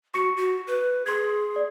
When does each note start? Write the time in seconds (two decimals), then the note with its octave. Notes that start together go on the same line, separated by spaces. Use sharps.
0.14 F#4 C#6 C#7
0.37 F#4
0.67 B4
1.06 G#4 C6 G#6
1.56 D5